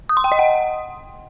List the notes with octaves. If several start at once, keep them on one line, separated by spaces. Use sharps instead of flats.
D#6
C6
G5
D#5
F#5